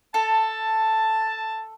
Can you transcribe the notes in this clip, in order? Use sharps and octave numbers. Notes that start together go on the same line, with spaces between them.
A4 A5